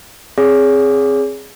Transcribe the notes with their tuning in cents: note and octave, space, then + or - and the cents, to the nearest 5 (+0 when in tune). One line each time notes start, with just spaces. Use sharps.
C4 +15 G#4 +0 C#5 +40